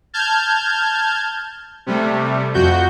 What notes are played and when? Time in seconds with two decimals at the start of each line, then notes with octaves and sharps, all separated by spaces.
0.13 A5 F6 G6 G#6
1.86 C3 G3 A3
2.54 F2 F#4 G6